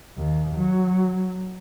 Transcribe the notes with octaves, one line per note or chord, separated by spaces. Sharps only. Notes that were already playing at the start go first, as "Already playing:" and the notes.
D#2
F#3